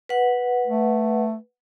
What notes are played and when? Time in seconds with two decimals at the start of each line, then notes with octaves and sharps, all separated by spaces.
0.09 B4 F#5
0.67 A3